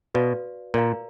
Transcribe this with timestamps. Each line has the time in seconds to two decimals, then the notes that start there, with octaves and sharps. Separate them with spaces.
0.14 B2 F#4 B4 D5 F5
0.74 A#2 A#4 D5 F5 A#5